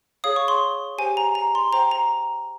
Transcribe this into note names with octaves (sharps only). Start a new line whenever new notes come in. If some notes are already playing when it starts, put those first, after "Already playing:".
G#4 C#5 F5 D#6
C#6
C6
G4 C5 G5 G#5
A#5
A#5
C6
C5 G5 A#5
A#5